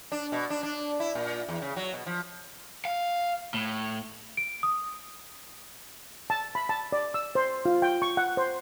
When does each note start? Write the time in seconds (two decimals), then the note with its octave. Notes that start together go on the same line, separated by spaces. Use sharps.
0.12 D4
0.32 B2
0.50 D4
0.63 D4
1.00 E4
1.15 A#2
1.48 E2
1.62 C#3
1.76 F#3
1.93 B2
2.06 F3
2.85 F5
3.54 A2
4.37 D7
4.63 D#6
6.30 A5
6.55 B5
6.69 A5
6.92 D5
7.14 E6
7.35 C5
7.66 F4
7.82 G5
8.02 C#6
8.17 F#5
8.37 C5